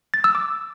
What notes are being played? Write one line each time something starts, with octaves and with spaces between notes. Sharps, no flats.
A6
E6
D6